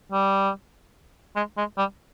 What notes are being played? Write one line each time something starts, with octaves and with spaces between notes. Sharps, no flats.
G3
G#3
G#3
G3